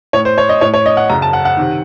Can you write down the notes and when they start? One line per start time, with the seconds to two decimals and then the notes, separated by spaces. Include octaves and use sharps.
0.13 A2 C#5
0.25 C5
0.38 C#5
0.49 D#5
0.61 A2 C#5
0.74 C#5
0.86 D#5
0.97 F#5
1.09 F#2 C#3 A#5
1.22 A5
1.33 F#5
1.45 F#5
1.57 C3 D#3